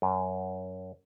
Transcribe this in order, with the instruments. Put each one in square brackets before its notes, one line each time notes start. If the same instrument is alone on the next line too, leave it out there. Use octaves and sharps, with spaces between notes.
[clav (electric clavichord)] F#2